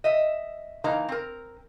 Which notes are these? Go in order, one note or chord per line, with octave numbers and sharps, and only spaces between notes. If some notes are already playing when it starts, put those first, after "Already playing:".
D#5 E5
E3 A#3 D#4 F5 A#5
C4 A#4